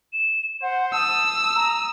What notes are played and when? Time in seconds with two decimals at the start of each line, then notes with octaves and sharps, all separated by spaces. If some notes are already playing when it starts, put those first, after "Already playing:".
0.13 E7
0.62 C5 F#5
0.93 A5 D#6 E6
1.56 A#5